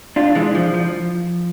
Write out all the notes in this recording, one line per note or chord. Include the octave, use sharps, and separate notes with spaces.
D4 F4
E3 G#3
F3
F3